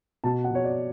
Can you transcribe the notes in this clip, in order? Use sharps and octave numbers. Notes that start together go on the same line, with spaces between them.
B2 A5
F#5
B2 C#5
D5